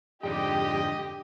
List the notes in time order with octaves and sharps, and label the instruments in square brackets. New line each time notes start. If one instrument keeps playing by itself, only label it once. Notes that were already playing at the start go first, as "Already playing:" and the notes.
[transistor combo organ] F2 G#2 [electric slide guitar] D3 D5 G5 [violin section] G4 [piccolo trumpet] D#5